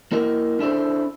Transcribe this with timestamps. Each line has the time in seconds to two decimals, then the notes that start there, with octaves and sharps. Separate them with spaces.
0.12 A#3 E4 A#4 D#5
0.59 C#4 D4 E4 A4 C5